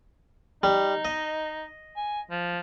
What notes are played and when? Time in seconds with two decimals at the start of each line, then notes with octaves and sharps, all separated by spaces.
0.63 G3 D#4
1.05 D#5
1.97 G#5
2.31 F3